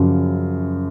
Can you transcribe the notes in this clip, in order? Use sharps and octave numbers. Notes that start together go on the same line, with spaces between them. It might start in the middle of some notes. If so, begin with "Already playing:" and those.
Already playing: F#2 C#3 F3